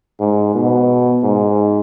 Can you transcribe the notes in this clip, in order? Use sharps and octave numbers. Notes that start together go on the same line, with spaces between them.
G#2
B2
G#2